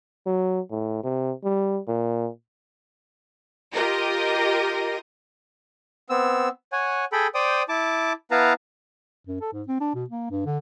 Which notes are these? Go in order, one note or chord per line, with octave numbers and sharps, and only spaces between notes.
F#3
A2
C3
G3
A#2
F4 G4 A#4 D#5
B3 C4 E6
C#5 F#5 G#5
G#4 A4 G5 B5
C5 D5 G5 D#6
E4 A5 D6
B3 E4 B4 F5 A5 A#5
F#2
A4
G#2
C4
D4
B2
A#3
G2
D3